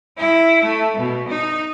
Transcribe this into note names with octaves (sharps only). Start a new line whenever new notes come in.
E4
A3
B2
D#4